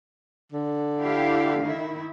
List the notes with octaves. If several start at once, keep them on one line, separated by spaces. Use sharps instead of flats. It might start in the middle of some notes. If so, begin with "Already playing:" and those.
D3
E4 G4 F5
D#3 E4